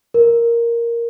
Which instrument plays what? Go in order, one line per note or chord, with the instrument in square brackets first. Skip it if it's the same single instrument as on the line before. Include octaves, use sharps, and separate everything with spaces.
[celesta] A#4